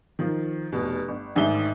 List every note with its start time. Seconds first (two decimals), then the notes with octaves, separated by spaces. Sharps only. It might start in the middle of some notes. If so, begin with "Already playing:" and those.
0.19 D#3 F3
0.72 F1 B2
1.08 G1
1.35 A1 G#2 D#3 D4 E5 G7